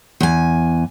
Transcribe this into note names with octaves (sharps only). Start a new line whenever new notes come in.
E2 G#5